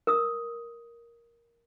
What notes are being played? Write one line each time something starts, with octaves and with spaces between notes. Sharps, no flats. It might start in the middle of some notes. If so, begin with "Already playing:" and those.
A#4 D#6 E6